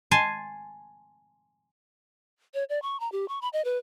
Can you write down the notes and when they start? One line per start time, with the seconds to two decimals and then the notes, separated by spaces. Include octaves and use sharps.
0.11 G#5 A5 C6
2.54 C#5
2.69 D5
2.82 C#6
3.00 A#5
3.12 G4
3.28 C#6
3.42 B5
3.53 D#5
3.65 B4